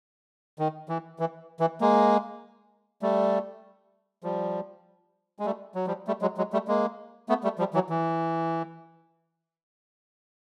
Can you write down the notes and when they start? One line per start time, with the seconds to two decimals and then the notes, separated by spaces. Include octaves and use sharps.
0.59 D#3
0.89 E3
1.19 E3
1.60 E3
1.81 G#3 A#3
3.02 G3 A3
4.24 F3 G3
5.39 G#3
5.45 G3 A3
5.75 F#3
5.87 F3 G3
6.07 G3 A3
6.21 F#3 G#3
6.37 F#3 G#3
6.53 G3 A3
6.68 G#3 A#3
7.29 A3 B3
7.44 G3 A3
7.58 F3 G3
7.74 E3 F#3
7.90 E3